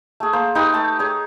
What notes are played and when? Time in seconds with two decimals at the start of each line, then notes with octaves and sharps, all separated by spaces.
0.20 A3 G#4
0.33 A#3 C5
0.55 D#4 G4 B4
0.73 A3 A5
0.99 G#4 C#5